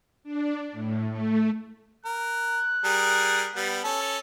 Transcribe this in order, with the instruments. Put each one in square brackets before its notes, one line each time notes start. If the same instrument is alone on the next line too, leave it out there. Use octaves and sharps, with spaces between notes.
[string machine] D4
A2
A3
[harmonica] A#4 [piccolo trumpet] F#6
[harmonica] G3 G#4 A#4
G3 B3
C#4 A4